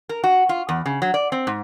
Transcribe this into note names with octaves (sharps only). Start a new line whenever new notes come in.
A#4
F#4
F4
E2
C#3
F#3
D5
C4
G#2